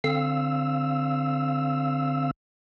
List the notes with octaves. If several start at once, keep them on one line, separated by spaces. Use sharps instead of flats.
D3 C4 F5 E6